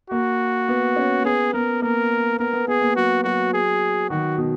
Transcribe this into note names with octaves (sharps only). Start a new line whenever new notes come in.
A#3 F#4
B3
C#4
B3 G#4
B3 A#4
A#3 A#4
B3 A#4
B3
B3 G#4
A#3
F#3 F#4
F#3 F#4
G#4
D#3 F#4
B2